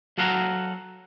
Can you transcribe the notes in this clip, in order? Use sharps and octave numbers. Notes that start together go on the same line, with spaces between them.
F#3 F#4 A4 F5 F#5 A#5